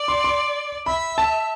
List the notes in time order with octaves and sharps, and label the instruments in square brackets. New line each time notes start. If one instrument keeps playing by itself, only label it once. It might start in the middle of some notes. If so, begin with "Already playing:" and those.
Already playing: [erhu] D5
[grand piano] C6
C6
[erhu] E5 [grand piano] B5
[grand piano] A5